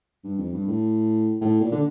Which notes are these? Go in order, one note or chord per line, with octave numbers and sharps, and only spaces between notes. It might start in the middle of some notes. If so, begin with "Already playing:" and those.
G2
F2
G2
A2
A2
A#2
D3